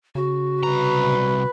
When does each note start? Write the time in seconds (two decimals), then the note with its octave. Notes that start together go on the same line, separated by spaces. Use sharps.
0.15 C#3 F#4
0.63 C2 B4 A#5